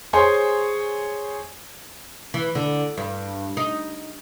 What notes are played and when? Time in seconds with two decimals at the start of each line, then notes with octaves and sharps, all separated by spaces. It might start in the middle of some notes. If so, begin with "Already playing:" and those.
0.13 G#4 C5 C#5 G#5 C6
2.34 E3
2.55 D3
2.98 G2
3.57 D#4